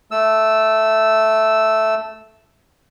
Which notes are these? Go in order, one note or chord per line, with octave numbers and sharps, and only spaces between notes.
A3 E6